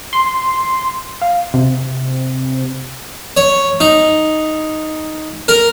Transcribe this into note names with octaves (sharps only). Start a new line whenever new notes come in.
C6
F5
C3
C#5
D#4
A#4